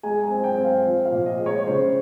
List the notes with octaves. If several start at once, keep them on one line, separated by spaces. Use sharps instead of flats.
G#3 G#5
G#5
C4
G5
C4
F5
F3
F5
A#2
D#5
G#3
C#5
C#3 C5